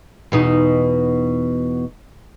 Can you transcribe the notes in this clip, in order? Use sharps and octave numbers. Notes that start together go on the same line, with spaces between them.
E2 B2 D#4